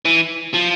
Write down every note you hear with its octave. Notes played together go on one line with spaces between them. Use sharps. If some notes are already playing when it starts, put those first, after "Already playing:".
E3
F3